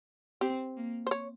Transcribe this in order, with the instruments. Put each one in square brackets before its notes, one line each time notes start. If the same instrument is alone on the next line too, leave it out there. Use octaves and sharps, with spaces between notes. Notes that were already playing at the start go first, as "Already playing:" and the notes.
[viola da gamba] C4 [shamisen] G4
[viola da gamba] A#3
[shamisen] C5
C#5